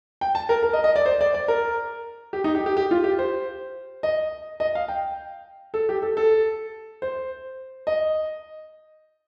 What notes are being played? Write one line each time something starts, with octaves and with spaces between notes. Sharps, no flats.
G5
A5
A#4
A#4
D#5
D#5
D5
C5
D5
D5
A#4
G4
D#4
G4
G4
G4
F4
G4
C5
D#5
D#5
F5
G5
A4
G4
A4
A4
C5
D#5